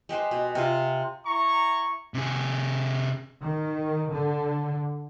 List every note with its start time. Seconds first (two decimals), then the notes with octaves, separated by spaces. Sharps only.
0.09 G#3 G4 B4 C5
0.31 B2
0.55 C3 F4
1.27 E4 A#5 C#6
2.14 C3 G#4
3.41 D#3
4.10 D3